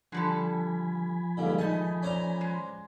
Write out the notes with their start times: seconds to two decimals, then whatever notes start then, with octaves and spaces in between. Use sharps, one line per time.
0.12 D3 F3 G3 A4 G#5 B5
1.37 G2 A#2 D3 D#3 G#3
1.58 A3 D#4 D#5
2.03 C#4 C5 D5 A#5
2.41 G#3